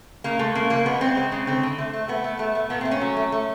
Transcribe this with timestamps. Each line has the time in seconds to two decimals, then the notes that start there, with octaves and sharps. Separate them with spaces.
0.24 C#3 A#3
0.39 G#3 A3
0.55 C#3 A#3
0.70 F3 A#3
0.85 G#3 B3
1.01 C#3 C4
1.17 G#3
1.32 C#3
1.47 D3 C4
1.63 D3
1.78 A3
1.94 A3
2.08 A3 B3
2.24 A3
2.39 A3
2.55 A3
2.70 A#2 B3
2.81 C4
2.85 A3
2.91 C#4
3.01 F#3
3.17 A3
3.32 A3